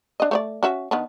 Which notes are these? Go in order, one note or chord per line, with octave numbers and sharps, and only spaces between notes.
D4 D#5
A3 C#5 D5
C#4 F#4 E5
D#3 B3 D4